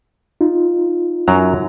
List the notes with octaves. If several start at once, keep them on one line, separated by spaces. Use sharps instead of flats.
D#4 F4
F#2 F#3 A#5